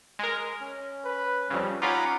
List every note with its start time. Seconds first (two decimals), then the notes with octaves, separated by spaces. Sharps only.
0.19 G#3 A#4
0.60 C#4
1.05 B4
1.50 F2 C#3 G3
1.82 C#4 D#4 F4 F#5 A#5 B5 D6